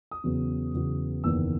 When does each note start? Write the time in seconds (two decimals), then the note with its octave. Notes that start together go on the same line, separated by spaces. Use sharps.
0.11 D#6
0.24 E2 C#3 F#3 B3
0.74 E2 C#3 F#3 B3
1.24 F#1 E2 D#3 A#3 E6